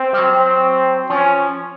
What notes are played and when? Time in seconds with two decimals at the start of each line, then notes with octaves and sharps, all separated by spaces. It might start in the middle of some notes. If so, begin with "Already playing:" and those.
Already playing: C4
0.13 G3
0.18 F#3
0.31 C4
1.10 F3 C#4